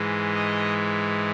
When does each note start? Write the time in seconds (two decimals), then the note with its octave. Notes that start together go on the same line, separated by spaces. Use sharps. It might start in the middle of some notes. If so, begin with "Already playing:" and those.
Already playing: G#2 E3 G#3
0.35 D#5